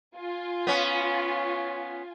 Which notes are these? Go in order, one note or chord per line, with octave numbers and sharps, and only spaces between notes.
F4 G#5
B3 C#4